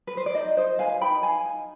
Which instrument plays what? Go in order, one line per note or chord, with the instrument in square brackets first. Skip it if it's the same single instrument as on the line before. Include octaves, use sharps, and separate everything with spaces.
[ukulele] B4
C5
D5
D#4 C5 D#5
D#4 C5 D#5
B4 F5 G#5
D#4 G5 B5
G#4 F5 G#5
D#4